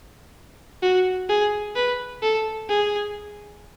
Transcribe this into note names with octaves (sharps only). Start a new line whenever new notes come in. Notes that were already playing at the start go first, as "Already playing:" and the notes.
F#4
G#4
B4
A4
G#4